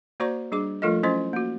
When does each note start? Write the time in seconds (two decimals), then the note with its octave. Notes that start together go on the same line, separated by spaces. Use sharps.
0.20 A#3 F#4 C5 D5 A#5 C#6
0.52 G3 D4 G#4 D6
0.82 F3 A3 F4 A4 A#4 D#5
1.03 F#3 C#4 E4 C5 D#5 C6
1.33 A#3 F#4